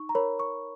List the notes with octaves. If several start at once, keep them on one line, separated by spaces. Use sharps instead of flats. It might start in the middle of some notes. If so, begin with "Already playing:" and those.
Already playing: D#4 C#6
A#5
A#4 C#5 B5
C#6